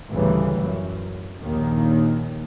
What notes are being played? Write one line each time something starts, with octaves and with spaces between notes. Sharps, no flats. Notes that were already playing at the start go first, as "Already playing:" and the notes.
A1 D2 C#3 E3 G3
F#2
A#1 D#2 D#3